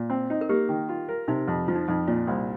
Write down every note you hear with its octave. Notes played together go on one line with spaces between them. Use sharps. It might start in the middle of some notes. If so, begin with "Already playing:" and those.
Already playing: A#2
C4
D#4
A#4
A#3 G4
D#3
F4
A#4
C3 D#4
F2
F3 F4
D#4
F2 D#4
A#2 F4
C2